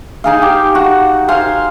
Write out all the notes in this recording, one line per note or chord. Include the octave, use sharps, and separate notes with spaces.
D#4 G#4 F5
G4
F#4
C5 F5 G#5